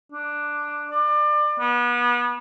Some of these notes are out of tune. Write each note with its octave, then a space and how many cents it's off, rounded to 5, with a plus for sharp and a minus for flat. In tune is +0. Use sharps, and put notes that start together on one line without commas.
D4 +5
D5 +30
B3 -30